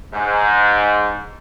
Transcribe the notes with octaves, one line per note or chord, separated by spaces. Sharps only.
G#2